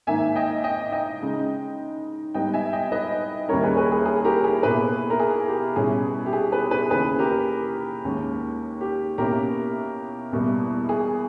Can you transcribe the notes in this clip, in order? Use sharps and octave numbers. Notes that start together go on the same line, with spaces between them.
G#2 D#3 A#3 D#4 E5 G#5
D#5 G5
D#5 G5
D#5 G5
C#3 G#3 D#4
G#2 G3 B3 D#4 D#5 G5
E5 G#5
D#5 G5
B4 D#5
D#2 C#3 G3 C#4 E4 A#4 C#5
G#4 B4
G#4 B4
G#4
G#4
G4 A#4
G#4
B2 A#3 E4 G#4 B4
A#4
G#4
G4
B2 G3 C#4 E4 G#4
G4
G#4
G#4 B4
G#4 B4
D#2 C#3 E3 G#4 B4
G4 A#4
D#2 D#3 G#3 C#4
G4
B2 A#3 C#4 E4 G4 A#4
E2 B2 G3 A#3 E4
G#4